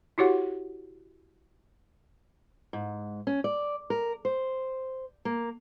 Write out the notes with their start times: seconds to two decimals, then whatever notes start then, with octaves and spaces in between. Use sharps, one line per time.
0.18 E4 F#4 G4 C#5 F#5
2.73 G#2
3.27 C#4
3.44 D5
3.90 A#4
4.25 C5
5.25 A#3